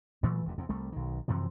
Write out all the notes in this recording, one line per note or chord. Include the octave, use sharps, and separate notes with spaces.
A#2 E3 F#3 A3
F1 D#2 C3
E2 C3
C2 G3 A3
B1 D#3
F#2 C3 E3 F3